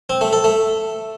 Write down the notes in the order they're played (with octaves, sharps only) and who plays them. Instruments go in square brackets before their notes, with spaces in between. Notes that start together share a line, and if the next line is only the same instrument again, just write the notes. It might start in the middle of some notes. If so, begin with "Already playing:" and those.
[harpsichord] C4
A3
A4
A3